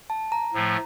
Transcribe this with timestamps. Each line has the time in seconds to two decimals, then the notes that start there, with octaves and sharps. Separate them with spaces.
0.10 A5
0.32 A#5
0.53 A2 F3 A3